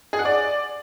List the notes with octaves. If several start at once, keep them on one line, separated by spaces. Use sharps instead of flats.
G#4
F#5
D5